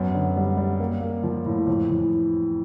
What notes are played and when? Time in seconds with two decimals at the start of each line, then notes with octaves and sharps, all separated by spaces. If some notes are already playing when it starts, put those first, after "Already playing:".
Already playing: F#2 B3
0.14 D3
0.36 G3
0.57 G3
0.80 A#3
1.01 A#3
1.23 F3
1.45 A2
1.67 F2
1.89 E3